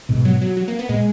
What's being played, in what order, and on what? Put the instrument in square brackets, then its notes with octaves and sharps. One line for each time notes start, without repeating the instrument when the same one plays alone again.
[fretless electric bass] G#2 B2
[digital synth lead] F#3
F#3
F#3
A#3
B3
[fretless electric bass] A#2 [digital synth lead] G#3